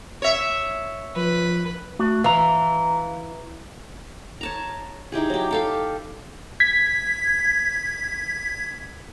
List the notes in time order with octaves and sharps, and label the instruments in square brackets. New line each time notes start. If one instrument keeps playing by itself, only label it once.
[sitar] C#5 E5
[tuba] F3 [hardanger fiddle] B4
[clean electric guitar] A3 F#4
[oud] E3 [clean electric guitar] F5 A#5
[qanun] C#5 A5 A#5
D#4 E4 G4 G#4
F#3 G4
G4 A4 F5
[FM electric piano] G#6 B6